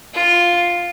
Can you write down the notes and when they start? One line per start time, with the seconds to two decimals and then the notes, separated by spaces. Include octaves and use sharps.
0.14 F4